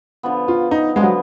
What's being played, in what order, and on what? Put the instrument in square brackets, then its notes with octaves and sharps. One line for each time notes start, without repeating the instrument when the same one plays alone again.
[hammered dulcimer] D3 F3 B3
[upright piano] F4
D#4
[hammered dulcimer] D3 F3 B3 [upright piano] G#3
[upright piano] F#3